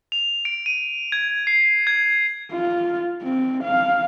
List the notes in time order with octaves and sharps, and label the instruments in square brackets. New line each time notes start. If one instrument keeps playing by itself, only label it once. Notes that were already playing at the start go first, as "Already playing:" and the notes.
[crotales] F7
D7
D#7
G#6
C7
G#6
[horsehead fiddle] F4
C4
F5